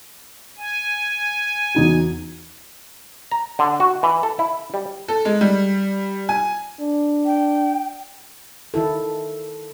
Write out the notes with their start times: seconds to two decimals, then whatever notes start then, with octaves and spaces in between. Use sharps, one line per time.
0.57 G#5
1.75 E2 D#4 F#4
3.31 A#5
3.59 D3
3.80 F#4
4.03 E3
4.23 A4
4.39 E4
4.74 G3
5.08 A4
5.25 G#3
5.41 G3
6.29 G#5
6.80 D4
7.26 G5
8.74 D#3 E4 A4